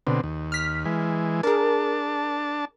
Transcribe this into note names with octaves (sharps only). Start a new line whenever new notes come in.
B2 D3 C4
D#2
F6 B6
E3 G#3
D4 G#4 A#4 A5